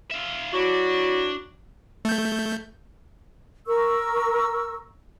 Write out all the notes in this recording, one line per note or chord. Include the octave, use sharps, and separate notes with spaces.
F4 E5
F#3 D4 E4 F#4
A3 G6
A#4 C#6 E6